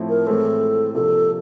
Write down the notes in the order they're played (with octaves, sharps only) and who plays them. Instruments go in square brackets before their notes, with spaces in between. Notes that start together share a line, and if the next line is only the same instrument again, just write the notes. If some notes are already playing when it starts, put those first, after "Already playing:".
Already playing: [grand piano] A2 F3 A3 C4 E4
[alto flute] A#4
[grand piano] A2 E3 G#3 C4 [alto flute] A4
[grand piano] C3 F3 A#3 D4 [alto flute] A4